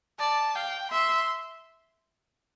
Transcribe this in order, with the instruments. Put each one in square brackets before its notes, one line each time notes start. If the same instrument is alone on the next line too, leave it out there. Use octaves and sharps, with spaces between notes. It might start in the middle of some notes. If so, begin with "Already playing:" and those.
[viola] D5 [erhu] A5
[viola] F5 [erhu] G5
[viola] E5 [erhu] C6